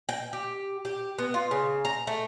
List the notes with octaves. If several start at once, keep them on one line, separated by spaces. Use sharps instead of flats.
G5
G4
G4
B3
F4
C#3
A#5
A3